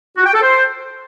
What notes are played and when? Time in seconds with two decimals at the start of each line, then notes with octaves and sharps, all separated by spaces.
0.17 F#4
0.25 G5
0.34 A4
0.42 C5